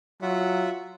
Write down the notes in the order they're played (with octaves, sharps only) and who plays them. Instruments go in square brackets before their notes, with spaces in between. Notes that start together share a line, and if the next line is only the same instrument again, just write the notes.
[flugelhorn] F#3 [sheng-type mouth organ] F4 E5 F#5